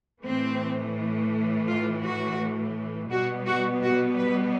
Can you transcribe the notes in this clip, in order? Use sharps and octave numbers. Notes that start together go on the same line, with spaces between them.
A2 E3 A3 C4
F4
F#4
B2 G3 B3 F#4
F#4
F#4
B4